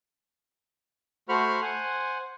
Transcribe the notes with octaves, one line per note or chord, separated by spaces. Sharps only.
A3 F#4 C5 B5 C#6 F6
C5 F#5 G#5